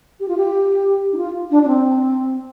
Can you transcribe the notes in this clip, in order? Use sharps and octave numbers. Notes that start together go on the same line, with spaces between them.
G4
F4
G4
D#4
F4
D4
D4
C4